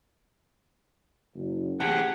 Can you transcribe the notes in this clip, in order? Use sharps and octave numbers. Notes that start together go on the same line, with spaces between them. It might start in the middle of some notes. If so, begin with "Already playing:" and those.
F#1
A1 C3 G4 G#4 F#5 G5 A5